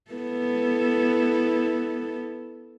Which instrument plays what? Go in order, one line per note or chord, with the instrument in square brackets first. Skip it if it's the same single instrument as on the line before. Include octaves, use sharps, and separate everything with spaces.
[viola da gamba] B3 E4 A4